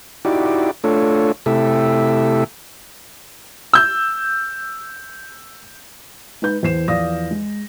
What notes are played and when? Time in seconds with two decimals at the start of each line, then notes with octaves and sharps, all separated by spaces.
0.25 D#4 E4 F#4 G4 D5
0.84 A3 D4 F4 A4 C#5
1.46 C3 A3 E4 G4 A4 E5
3.73 E6 G6
6.42 G#3 D#4 B4 G6
6.63 E2 C5 C7 E7
6.88 E2 F3 D5 F5 D#6 A#6
7.31 G#3